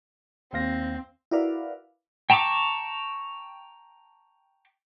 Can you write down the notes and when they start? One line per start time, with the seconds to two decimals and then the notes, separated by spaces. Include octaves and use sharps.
0.53 D#2 C4 F5 A#6
1.31 E4 F#4 A#4 B4 D5 F5
2.30 G5 A5 A#5 C#6 D6